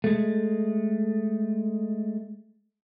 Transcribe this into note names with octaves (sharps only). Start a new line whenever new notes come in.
G#3 A3